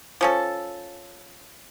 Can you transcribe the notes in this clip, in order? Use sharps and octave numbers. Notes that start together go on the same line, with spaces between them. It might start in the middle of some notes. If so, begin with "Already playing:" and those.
F3 C#4 A4